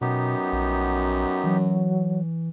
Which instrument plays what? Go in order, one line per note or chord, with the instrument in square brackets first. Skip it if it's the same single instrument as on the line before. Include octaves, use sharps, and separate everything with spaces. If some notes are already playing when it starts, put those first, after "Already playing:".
[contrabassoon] F#2 [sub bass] B2 [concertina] B3 D#4 G4
[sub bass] A#1
[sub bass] E3 [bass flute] F#3